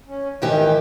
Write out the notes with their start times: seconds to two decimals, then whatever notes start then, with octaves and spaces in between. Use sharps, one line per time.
0.07 C#4
0.42 G#2 D#3 E3 G4